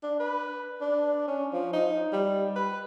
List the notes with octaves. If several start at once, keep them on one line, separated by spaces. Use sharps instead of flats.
D4
B4
D4
C#4
F3
D#4
G3
B4